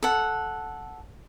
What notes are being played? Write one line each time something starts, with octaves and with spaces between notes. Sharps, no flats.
A4 F#5